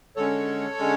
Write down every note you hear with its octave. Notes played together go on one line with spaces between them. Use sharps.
D3 G#3 C#4 A4 C#5
D3 G#3 C#4